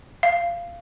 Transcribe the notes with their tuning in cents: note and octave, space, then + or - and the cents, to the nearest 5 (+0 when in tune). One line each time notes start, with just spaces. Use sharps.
F5 -15